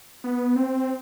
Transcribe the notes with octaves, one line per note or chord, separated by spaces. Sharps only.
B3
C4